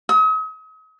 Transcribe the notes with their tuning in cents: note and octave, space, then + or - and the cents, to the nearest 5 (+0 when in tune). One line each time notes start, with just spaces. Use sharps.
D#6 +40